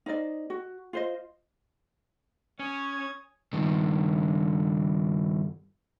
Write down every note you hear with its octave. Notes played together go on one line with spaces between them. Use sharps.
D#4 C5 D5 D#5
F#4
F4 C5 D#5
C#4 C#5 G#5 D#6 G#6
G2 D#3